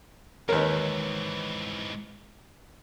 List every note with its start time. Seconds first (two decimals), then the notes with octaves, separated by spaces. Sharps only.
0.49 D#2 G#2 E3 A#4 B4 C#5